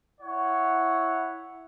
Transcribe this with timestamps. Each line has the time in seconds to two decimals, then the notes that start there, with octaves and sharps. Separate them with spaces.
0.21 E4 C#5 F#5